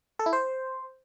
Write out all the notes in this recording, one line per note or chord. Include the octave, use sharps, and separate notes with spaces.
A4
E4
C5